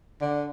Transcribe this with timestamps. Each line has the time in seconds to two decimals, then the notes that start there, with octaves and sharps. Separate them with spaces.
0.21 D3